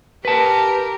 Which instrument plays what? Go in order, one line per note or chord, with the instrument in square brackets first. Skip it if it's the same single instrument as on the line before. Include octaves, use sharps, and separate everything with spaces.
[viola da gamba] G4 A#4 [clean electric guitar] B4 A5